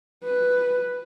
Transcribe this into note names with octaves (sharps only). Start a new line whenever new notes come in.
B4